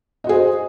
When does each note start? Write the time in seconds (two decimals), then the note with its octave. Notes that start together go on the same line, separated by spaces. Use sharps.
0.24 D#5
0.27 F#4
0.29 G#4
0.32 C5